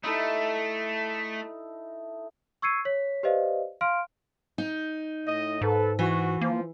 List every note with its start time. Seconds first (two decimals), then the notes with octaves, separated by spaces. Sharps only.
0.03 A3 D#4 E4 A4
2.62 C#6 E6 G#6 C7 C#7 D#7
2.85 C#5 B6
3.23 G4 B4 C5 D5 D#5 F5
3.81 F5 C6 F6 D7
4.58 D#4
5.25 A2 D#5
5.61 G#2 A4 B4
5.99 E3 F#4
6.41 F3 A#3